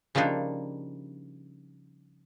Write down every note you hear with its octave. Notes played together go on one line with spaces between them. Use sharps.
C#3 F3 G3 A#3 D4 D#4